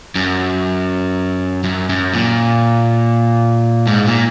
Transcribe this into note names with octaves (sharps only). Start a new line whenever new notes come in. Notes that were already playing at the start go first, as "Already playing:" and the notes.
F#2
F#2
F#2
A#2
G#2
A#2